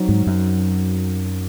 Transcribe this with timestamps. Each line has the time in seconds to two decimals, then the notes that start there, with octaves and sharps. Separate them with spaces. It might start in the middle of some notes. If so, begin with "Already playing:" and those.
Already playing: F#3 C4 D#4
0.09 G#2
0.27 F#2